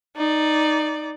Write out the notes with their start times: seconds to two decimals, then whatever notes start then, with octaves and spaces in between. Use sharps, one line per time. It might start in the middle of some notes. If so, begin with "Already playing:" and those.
0.16 D#4 D5